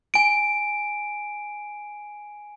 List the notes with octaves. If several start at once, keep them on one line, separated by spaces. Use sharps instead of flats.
G#5 D7